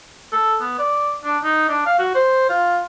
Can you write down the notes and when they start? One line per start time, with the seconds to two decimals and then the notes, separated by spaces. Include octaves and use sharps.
0.32 A4
0.61 B3
0.79 D5
1.24 D4
1.44 D#4
1.69 D4
1.86 F5
1.99 F#4
2.15 C5
2.49 F4